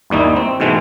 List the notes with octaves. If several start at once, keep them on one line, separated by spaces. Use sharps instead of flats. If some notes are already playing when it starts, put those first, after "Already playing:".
G1 D#2 G3 D#4 E4
C4
G#2 B2 E3 G#3 A3